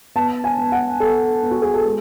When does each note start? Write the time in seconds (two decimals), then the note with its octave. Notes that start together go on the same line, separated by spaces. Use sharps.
0.15 B3 A5
0.44 G#5
0.58 B3
0.72 F#5
1.00 B3 A4
1.43 B3
1.51 F#4
1.62 G#4
1.74 A4
1.86 G#3